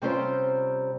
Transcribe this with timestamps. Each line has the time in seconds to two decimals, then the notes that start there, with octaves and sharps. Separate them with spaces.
0.02 C3 G3 C4 C#4 F4 C5